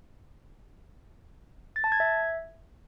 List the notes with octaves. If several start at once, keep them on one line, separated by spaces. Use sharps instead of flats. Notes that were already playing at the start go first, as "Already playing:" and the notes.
A6
A5
G#6
E5